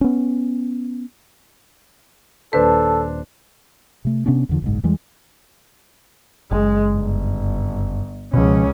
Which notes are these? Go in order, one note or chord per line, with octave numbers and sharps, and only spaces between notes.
B3 C#4
D#1 D4 A4 B4 C5
C3 A3
C3 B3 C#4 D4
E2 D3 F3
F#1 B1 G#2
E2 E3 G3 G#3
F#1 G#3
G1
C#2 B2 F3 C#4